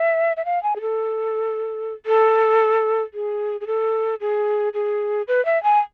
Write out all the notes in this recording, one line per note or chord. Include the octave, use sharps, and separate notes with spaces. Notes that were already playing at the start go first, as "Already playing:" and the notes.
Already playing: E5
E5
F5
G#5
G#4
A4
A4
G#4
G#4
A4
G#4
G#4
B4
E5
G#5